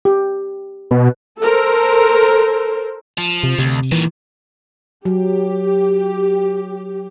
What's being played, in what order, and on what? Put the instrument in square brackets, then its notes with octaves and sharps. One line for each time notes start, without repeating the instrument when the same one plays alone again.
[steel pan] G4
[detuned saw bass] B2 [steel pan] B4
[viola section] A4 A#4 C5
[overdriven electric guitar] F3
[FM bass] C3
[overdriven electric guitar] D2 [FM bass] C3
[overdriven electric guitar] A#2 D#3 [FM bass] E3
[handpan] F#3 [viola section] G4